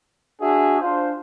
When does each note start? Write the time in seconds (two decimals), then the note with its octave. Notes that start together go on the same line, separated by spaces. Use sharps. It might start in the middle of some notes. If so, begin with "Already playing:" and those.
0.40 D4 F#4 G#4 E5
0.80 D4 F4 C5